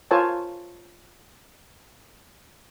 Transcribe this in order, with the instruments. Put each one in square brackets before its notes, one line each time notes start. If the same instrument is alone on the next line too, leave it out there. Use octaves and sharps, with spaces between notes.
[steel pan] F4 A#4 C5 C#5 G#5 A5